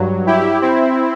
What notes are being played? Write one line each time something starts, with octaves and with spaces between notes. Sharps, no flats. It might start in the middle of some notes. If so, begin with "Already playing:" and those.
Already playing: G2 F#3
E4 G4
C4 E4